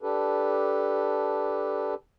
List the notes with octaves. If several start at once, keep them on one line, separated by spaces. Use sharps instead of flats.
D4 G4 A4 B4